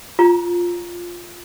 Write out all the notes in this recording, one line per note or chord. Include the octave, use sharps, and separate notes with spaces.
F4 A#5